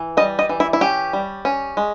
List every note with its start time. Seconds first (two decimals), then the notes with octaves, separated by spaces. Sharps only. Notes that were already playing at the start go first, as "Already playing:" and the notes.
Already playing: E3
0.17 G3 D#5
0.39 D#5
0.49 E3
0.60 E4
0.73 E4
0.81 C#4 G4
1.13 G3
1.45 C#4
1.77 G#3